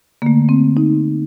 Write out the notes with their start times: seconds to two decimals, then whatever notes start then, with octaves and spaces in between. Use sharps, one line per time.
0.22 D3 A3 A#3
0.49 C4
0.77 D#4